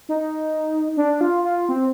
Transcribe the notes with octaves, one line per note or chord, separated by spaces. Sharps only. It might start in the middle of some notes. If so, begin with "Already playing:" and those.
D#4
D4
F4
F4
C4